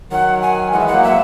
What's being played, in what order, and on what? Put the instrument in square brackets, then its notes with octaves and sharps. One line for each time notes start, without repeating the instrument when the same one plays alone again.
[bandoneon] D#3 F#3 [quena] F#5
[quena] G#5
[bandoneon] E3 G#3 [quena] F#5
[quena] E5
F#5
[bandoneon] F#3 A#3
[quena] E5